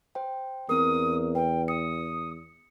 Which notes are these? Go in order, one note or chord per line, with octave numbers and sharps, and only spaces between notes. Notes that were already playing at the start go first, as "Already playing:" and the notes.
C5 G5
E2 C4 A#4 D#6
B4 G5
D#6 C#7